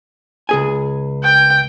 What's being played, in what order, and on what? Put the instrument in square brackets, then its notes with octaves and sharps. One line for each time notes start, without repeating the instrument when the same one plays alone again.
[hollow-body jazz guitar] C#2 G#4 G#5
[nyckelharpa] G5